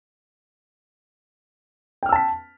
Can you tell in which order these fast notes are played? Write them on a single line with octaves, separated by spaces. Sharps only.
G5 F6 E6 A5 B6